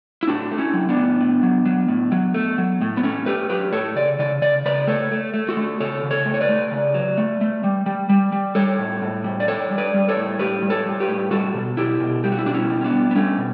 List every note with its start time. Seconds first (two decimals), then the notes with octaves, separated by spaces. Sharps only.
0.23 E4
0.27 A2 D4 F#4
0.51 A3
0.58 C#4 E4
0.73 F#3
0.89 B3 D4
0.97 A2
1.21 A2
1.43 F#3
1.66 F#3
1.88 A2
2.12 F#3
2.34 A3
2.58 F#3
2.82 A2
2.97 B3
3.03 A2 A3 C#4
3.26 A3 G4 B4
3.50 F#3 G4 B4
3.72 A2 A4 C#5
3.96 C#3 D5
4.19 C#3 D5
4.42 C#3 D5
4.65 C#3 B4 D5
4.87 A3 A4 C#5
5.12 A3
5.34 A3
5.49 F#4 A4
5.57 A3
5.80 C#3 A4 C#5
6.03 C#3
6.11 A4 C#5
6.25 A3
6.34 C#5
6.41 B4 D5
6.49 A3
6.71 C#3
6.94 F#3
7.18 A3
7.41 A3
7.64 G3
7.86 G3
8.09 G3
8.32 G3
8.55 G3 A4 C#5
8.79 A2
9.02 A2
9.24 G3
9.40 D5
9.48 G3 A4 C#5
9.70 G3
9.78 B4 D5
9.94 G3
10.09 A4 C#5
10.17 A2
10.39 A2 G4 B4
10.62 G3
10.70 A4 C#5
10.86 G3
11.00 G4 B4
11.08 A2
11.31 G3 F#4 A4
11.55 B2
11.77 B2 E4 G4
12.00 B2
12.24 G3 G4
12.32 F#4
12.39 E4
12.46 B2 D4 F#4
12.54 C#4 E4
12.70 G3
12.81 C#4
12.84 B3 D4
12.93 G3
13.11 B3
13.15 G3 A3 C#4
13.38 B2